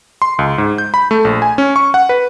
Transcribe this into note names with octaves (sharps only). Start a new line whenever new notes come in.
C6
C#2
G#2
G6
B5
A3
A#1
G#5
C#4
C#6
F#5
B4